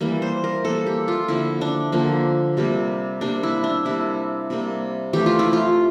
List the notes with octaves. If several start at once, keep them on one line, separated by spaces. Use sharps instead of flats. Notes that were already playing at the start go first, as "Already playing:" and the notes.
E3 G3 A#3
C5
A#4
E3 G3 A#3 A4
G4
F4
D3 F3 A#3 E4
D4
D3 F3 A#3
C3 G3 A#3
C3 G3 A#3 D4
E4
D4
C3 G3 A#3 E4
C3 G3 A#3
E3 A3 G4
F4
E4
F4